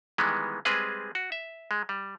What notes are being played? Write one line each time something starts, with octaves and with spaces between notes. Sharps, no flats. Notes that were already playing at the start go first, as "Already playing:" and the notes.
D#3 E3 G3 G#3 B3
G3 G#3 C4 G#4 B4
F#4
E5
G#3
G3